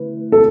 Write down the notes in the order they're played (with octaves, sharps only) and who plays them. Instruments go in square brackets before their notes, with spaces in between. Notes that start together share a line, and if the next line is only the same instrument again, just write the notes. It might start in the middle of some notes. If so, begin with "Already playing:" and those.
Already playing: [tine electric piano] D3 A3 E4 [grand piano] B4
[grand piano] A4